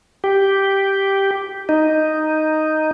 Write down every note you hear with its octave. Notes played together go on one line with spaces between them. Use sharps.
G4
D#4